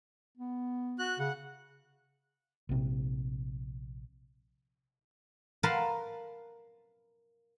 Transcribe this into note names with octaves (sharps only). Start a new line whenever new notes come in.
B3
F#4 F#6
C#3 F#5
A#1 C3
A#4 B4 F5 F#5 A5 C6